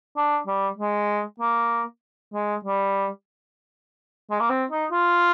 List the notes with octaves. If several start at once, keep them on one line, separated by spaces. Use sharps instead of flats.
D4
G3
G#3
A#3
G#3
G3
G#3
A#3
C4
D#4
F4